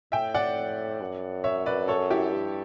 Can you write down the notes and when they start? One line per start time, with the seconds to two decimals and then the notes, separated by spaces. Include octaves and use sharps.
0.12 A2 E5 G5
0.34 D5 F#5
1.01 F#2
1.44 C#5 E5
1.66 B4 D5
1.88 A4 C#5
2.11 E4 G4
2.32 G2